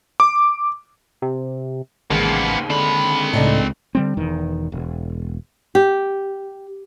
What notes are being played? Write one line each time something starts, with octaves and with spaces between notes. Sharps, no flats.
D6
C3
A1 D#2 G#2 C#3 A#3 B3
D3 C4 B5
C#2 A2 C#3 D4 D#4 A4
D3 G3 C4
E1 E2 D#3
E1
G4